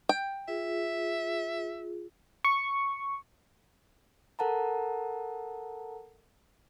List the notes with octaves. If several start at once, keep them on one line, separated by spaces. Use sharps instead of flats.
G5
F4 G#4 E5
C#6
A4 A#4 F#5 A5 A#5